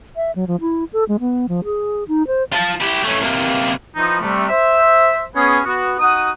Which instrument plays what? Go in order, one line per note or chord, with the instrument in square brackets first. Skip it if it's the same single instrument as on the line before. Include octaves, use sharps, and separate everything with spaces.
[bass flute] E5
F#3
F3
E4
A4
G#3
B3
F3
G#4
D#4
C5
[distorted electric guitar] F4 A5
E4 G4
A3 C#4
C3 A#3
[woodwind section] E3 F3 D#4
C3 G3 A3
C5 E5
B3 C#4 G#4
B3 F#4
D#4 F#4 F#5 D#6